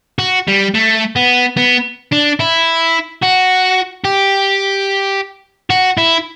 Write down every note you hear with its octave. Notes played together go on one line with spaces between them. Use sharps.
F#4
G3
A3
B3
B3
D4
E4
F#4
G4
F#4
E4